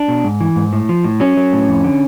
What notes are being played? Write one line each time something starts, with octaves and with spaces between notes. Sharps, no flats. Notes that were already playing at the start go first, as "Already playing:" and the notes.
Already playing: D4
B2
G#2
E3
G#2
A2
F3
A2
F#3 C#4
F#3
A2
F2
D3